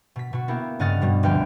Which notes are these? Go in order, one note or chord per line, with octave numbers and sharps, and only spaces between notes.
B2 B6
B2 F#4
A#3 B3 E4 G4
G2 C#3 D#5 F#5 F6 A6
G2 B2 G3 B3
F1 D2 B4 G5 F6